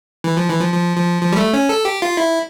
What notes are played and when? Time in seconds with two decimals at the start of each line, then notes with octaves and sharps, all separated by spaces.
0.24 E3
0.37 F3
0.49 E3
0.61 F3
0.73 F3
0.97 F3
1.21 F3
1.33 G3
1.37 A3
1.53 C#4
1.69 A4
1.85 G4
2.02 F4
2.17 E4